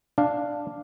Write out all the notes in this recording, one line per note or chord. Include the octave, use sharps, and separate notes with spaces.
D4 F5